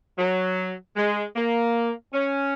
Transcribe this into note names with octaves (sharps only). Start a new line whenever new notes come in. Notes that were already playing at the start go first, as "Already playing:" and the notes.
F#3
G#3
A#3
C#4